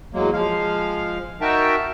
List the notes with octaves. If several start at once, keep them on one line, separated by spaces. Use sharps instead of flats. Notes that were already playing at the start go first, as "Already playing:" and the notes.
E2 F#3 G#3 A#3
F3 G#3 F5
D#4 F#4 A#4 E5 G5 A5